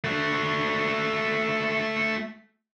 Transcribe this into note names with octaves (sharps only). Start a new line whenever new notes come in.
A3 F#4